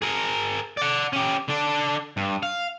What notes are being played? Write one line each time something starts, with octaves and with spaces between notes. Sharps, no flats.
G#4 A#4
D5 F#5
C#4 G4
D3 D4
G2
F5